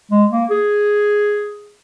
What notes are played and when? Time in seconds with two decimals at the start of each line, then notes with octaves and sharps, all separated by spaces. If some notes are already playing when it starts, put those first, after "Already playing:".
0.11 G#3
0.31 A#3
0.50 G#4